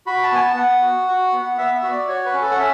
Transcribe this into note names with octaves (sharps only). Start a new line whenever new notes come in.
F#4 B5
A5
B3 G#5
A5
B3 F#5
F#4
F#4
B3
F#5
B3 E5
E5
F#4
D5
F#4 C#5
B4
C#4
A4
F#5
C#4 E5